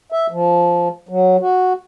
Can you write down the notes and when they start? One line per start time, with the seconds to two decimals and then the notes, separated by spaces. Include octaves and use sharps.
0.12 E5
0.31 F3
1.09 F#3
1.41 F#4